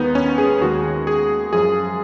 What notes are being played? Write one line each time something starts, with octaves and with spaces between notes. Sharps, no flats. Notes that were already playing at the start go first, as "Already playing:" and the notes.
Already playing: D#2 D#3 G#3 B3 D#4
C#4
G#4
D#2 D#3 G#3 F#4
G#4
F#2 F3 G#3 G#4